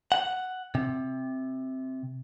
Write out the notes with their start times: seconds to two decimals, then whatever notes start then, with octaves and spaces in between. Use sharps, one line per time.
0.12 F#5
0.75 C3